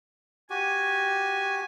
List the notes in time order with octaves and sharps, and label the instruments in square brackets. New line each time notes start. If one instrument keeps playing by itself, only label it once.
[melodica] F#4 G4 [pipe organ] G#5